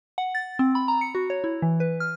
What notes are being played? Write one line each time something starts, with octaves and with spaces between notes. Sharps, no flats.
F#5
A6
C4
B5
A#5
C#7
F#4
C#5
E4
E3
B4
F6